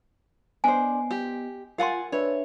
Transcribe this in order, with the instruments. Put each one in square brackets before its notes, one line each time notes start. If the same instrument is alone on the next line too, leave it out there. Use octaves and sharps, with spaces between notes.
[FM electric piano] B3 D#5 [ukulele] D4 C5 [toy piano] G#5
[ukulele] G4
[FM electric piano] F4 A6 [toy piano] A#4 C6 [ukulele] F5 F#5 G#5
[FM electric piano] D4 B4 E5 [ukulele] C#5